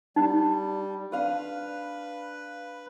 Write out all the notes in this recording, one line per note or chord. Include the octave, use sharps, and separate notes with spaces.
G3 D#4
D4 B4 F5 D#6